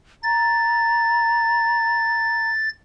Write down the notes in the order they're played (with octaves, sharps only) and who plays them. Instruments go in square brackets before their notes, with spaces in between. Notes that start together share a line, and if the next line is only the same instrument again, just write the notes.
[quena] A#5 [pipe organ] A6